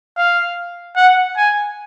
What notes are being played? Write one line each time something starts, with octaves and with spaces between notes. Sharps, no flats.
F5
F#5
G#5